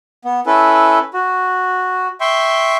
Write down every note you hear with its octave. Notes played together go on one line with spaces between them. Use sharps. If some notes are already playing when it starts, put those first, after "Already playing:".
B3
C#4 E4 A4 B4
F#4
E5 G5 C6 C#6